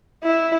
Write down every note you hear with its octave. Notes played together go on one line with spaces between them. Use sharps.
E4